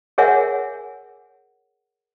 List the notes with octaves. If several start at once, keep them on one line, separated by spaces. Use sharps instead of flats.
G#4 A#4 C#5 E5 F#5 G#5